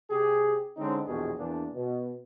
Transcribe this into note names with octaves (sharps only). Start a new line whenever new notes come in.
C3 G4 G#4
D3 G#3 C4 C#4 D#4
A#1 E2 B2 G4 G#4
E2 A#3 D4
B2